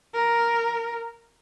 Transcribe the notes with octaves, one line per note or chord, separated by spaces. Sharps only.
A#4